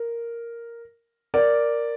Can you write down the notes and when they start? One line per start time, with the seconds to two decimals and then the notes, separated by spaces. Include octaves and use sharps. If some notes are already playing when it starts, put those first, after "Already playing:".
Already playing: A#4
1.34 A#4 D5